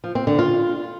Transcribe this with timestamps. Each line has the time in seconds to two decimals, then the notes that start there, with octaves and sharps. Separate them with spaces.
0.04 F3
0.15 C4
0.27 D3
0.39 F4